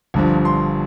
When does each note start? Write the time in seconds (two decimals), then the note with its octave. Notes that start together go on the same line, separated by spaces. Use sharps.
0.14 G1 G2 F3
0.45 C6